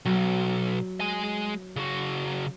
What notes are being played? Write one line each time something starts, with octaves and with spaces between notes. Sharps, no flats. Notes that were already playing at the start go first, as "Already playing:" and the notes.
B1 F#3
G#3 G#5
C#3 F#4